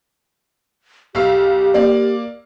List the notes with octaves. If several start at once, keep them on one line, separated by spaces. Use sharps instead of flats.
B1 G4 F5 E6
A#3 D5